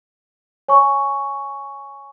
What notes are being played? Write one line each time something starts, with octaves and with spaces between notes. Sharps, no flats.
C#5 G#5 C#6